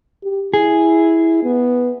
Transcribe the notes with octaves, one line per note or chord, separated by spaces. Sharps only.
G4
E4 G#4
B3